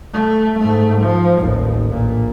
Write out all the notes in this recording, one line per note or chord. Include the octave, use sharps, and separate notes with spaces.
A3
G#2 A3
F3
A1 D#2
A#1 A#2